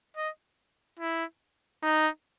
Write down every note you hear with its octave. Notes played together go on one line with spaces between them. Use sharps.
D#5
E4
D#4